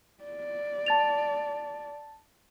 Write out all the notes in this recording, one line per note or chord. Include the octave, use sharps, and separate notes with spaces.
D5
A5 A6 F7